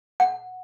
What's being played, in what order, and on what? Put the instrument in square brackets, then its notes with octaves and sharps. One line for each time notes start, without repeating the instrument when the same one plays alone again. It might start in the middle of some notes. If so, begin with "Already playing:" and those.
[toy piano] F#5